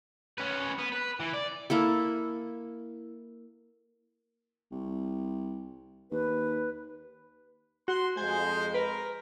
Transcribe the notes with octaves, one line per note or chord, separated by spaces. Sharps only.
C#4 B4
B3
B4
E3
D5
A#3 E4 A4
C2
D#2 B4
F#4 C6
F2 G#3 C5 G#5
A#4 B4